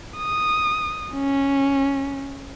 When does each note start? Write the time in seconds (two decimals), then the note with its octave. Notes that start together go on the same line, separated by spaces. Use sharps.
0.17 D#6
1.14 C#4